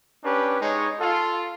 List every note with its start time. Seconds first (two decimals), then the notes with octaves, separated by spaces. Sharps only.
0.24 C#4 D4 G4 B4
0.61 G#3 D#4 C#5
1.00 F4 A4